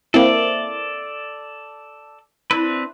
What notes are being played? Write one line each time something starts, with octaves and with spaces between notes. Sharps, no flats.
A#3 C4 E4 A4 D5
C4 D4 E4 B4